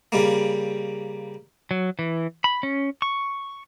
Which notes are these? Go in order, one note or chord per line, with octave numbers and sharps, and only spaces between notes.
C#3 G3 A#3
F#3
E3
B5
C#4
C#6